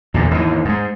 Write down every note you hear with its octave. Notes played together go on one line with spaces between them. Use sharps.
E2 A#2 D3
D#2 G#2 E3
G#2 G#3